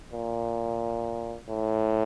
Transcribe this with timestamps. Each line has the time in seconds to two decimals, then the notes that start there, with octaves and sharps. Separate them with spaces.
0.13 A#2
1.50 A2